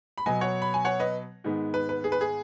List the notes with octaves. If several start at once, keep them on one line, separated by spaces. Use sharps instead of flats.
B5
B2 F#3 B3 D#5 G#5
C#5 F#5
B5
G#5
C#5 F#5
B4 D#5
G#2 D#3 G#3 B3
B4
B4
G#4
B4
G#4